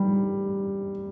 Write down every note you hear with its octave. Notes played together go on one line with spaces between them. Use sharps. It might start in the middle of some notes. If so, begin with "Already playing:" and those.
Already playing: G3